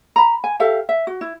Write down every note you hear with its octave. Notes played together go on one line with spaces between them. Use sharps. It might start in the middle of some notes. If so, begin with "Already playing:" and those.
A#5 B5
G#5
G4 A4 E5 F5
E5
F#4
E4